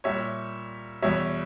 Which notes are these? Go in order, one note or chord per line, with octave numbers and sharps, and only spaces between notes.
A#2 G3 C#5 E5
E2 B2 G3 C#5 E5